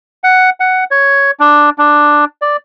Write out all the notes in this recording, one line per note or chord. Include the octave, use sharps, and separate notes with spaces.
F#5
F#5
C#5
D4
D4
D5